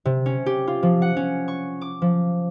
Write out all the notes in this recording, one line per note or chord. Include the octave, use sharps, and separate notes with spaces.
C3
C#4
G4
F4
F3
F#5
C#4
C#6
D6
F3